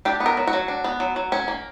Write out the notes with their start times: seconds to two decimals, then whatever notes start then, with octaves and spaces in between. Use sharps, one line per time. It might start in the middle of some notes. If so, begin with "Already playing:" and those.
0.05 D4 G4
0.20 B3
0.26 A#4
0.37 F#3
0.47 F#4
0.53 F#3
0.68 D4
0.84 B3
1.00 F#3
1.16 F#3
1.32 C#4
1.48 A#3